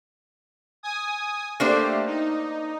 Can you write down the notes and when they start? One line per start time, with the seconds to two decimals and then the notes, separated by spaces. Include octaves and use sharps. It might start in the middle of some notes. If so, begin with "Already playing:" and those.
0.83 G#5 D#6
1.60 A3 A#3 D4 G4 C5
2.06 D#4